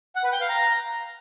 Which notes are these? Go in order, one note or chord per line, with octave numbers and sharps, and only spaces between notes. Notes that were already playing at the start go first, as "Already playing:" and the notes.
F#5
B4
G5
F5
A#5